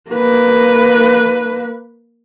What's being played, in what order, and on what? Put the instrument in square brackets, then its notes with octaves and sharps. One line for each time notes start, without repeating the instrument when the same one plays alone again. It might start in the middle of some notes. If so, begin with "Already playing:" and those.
[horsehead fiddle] A#3 B4